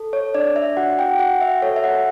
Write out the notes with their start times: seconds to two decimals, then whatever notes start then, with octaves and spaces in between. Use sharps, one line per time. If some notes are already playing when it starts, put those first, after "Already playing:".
Already playing: A4
0.13 C#5
0.35 D4 D5
0.56 E5
0.77 F#4 F#5
0.99 G5
1.19 F#4 F#5
1.41 E5
1.62 A4 C#5
1.76 E5
1.84 F#5